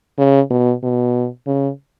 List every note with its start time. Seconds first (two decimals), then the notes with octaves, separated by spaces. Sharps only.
0.18 C#3
0.50 B2
0.83 B2
1.47 C#3